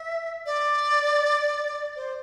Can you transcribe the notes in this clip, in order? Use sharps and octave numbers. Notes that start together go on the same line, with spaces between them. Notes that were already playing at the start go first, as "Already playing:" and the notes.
Already playing: E5
D5
C5